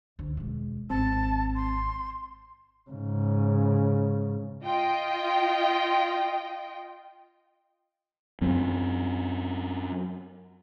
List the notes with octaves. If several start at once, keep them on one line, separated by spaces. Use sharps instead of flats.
D2
E1 G#3
G#1 C4 A5
C6
G#2 C#3
F4 D#5 G5
F#2 F#3 C4